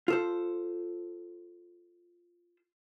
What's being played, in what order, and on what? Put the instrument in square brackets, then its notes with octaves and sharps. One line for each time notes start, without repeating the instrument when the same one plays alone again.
[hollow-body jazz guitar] F4 A4 C5